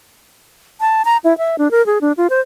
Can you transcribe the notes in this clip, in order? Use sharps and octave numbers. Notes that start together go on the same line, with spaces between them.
A5
A#5
E4
E5
D4
A#4
G#4
D4
F4
C5